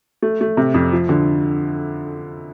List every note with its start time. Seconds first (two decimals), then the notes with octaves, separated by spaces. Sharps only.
0.22 A3
0.41 A3
0.57 C3
0.74 F2
0.92 F3
1.09 D3